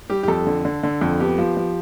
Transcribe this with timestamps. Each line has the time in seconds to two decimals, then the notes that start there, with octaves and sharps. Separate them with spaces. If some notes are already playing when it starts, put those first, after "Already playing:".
0.10 G3 G4
0.23 G4
0.28 F2 A4
0.47 D3
0.65 D3
0.83 D3
1.01 F2
1.20 B3 G4
1.38 F3
1.57 F3